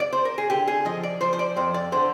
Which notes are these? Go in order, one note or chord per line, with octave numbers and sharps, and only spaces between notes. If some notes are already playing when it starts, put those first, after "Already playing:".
D5
C5
A#4
G#4
D3 G4
G#4
F3 D#5
D5
F3 C5
C5
D5
F2 C5
D5
D3 C5